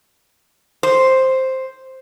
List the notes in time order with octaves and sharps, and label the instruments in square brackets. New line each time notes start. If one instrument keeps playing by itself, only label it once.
[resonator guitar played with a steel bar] C5